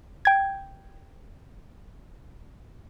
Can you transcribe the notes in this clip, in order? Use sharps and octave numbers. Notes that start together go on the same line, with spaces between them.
G5 G#6